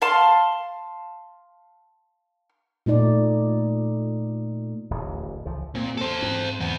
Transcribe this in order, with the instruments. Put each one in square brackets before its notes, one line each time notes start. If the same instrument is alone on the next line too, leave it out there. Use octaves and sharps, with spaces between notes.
[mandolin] F5 A5 C6
[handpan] A#2 A3 D#4 D5
[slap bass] D1 A1 D#2
C#2 E3 F3
[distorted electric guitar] A#2 [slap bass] C4
[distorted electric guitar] A4 C5
[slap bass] G#2 C4
[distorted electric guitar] E2 B3